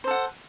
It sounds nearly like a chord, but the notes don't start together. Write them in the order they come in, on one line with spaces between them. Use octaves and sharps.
C5 A4 F#5